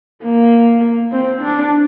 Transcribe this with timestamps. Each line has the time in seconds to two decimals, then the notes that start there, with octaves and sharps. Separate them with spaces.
0.23 A#3
1.12 C4
1.42 D4